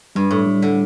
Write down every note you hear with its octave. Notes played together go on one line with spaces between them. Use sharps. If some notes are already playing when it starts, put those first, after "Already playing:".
G2 G3
A2
G3
D3